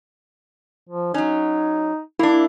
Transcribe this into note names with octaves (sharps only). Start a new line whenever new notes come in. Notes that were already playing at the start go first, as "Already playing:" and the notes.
F3
F#3 C#4 D#4
A#3 D4 E4